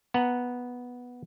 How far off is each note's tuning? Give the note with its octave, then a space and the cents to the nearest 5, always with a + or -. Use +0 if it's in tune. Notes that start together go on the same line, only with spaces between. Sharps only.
B3 -5 F#5 +0 A#5 +0